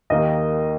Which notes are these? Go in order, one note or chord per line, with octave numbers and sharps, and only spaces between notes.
D#2 D#3 A#3 D#5